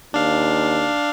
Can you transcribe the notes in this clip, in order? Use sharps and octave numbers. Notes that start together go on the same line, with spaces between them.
D#2 D4 F5